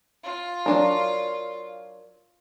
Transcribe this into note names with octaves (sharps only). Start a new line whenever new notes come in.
F4
F#3 D4 A#4